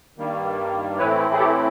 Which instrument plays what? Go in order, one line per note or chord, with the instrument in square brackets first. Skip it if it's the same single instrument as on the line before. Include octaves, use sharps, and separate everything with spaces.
[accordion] G2 D#3 G3 A#3
A2 E3 A3 C4 E4 B4 C#5
G#4
G4 A4